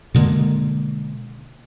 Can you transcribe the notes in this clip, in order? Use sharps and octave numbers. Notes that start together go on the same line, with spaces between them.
B2 D3 G#3 A#3